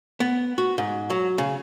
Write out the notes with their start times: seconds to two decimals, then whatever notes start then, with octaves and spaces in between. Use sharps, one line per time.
0.20 B3
0.58 F#4
0.78 G#2
1.10 F#3
1.38 C#3